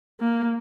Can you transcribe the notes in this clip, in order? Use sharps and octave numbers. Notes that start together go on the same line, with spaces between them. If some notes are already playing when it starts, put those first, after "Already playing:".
A#3